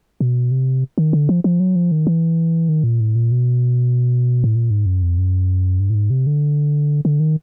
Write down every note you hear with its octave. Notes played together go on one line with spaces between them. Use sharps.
B2
C3
D#3
D3
F3
F3
F#3
F3
D#3
E3
D#3
A#2
A2
A#2
B2
A2
A#2
G#2
F#2
F2
F#2
G2
A2
G#2
C3
D3
D3
D#3